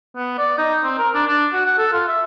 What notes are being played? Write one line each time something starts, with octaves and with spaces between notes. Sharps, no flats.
B3
D5
D#4
C4
A#4
D4
D4
F#4
F#5
A4
F4
E5